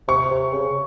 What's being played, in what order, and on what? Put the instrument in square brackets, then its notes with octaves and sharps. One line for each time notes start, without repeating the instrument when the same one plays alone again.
[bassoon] C3 [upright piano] C#6
[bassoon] C3
C#3